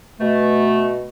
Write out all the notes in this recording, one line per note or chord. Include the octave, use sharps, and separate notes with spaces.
B2 A3